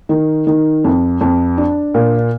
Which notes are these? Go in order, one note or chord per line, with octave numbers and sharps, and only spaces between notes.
D#3
D#3
F2
F2
D4
A#2